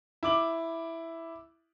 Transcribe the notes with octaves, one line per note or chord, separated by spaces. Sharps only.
E4 D6 F#7